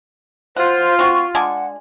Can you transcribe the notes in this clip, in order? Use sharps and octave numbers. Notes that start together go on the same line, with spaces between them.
F4 C5 F#5
C4 F#4 C#6
G#3 D4 F#5 G#5